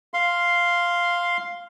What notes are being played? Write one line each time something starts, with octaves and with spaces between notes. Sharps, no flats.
F5 C6